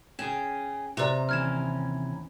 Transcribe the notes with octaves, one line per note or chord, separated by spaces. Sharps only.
C#4 G#4 G5 E7
C3 G4 B4 D5 A#5
D#2 E3 C#4 F6 G#6 E7